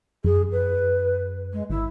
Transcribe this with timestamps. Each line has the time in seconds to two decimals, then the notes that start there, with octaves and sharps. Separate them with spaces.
0.24 F#2 G#4
0.52 B4
1.53 G#3
1.70 G#1 E4